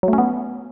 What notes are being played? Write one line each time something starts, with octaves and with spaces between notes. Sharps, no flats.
F#3
A3
C#4
B3